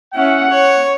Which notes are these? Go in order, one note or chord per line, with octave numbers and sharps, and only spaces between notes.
C#4 E4 F#5
C#5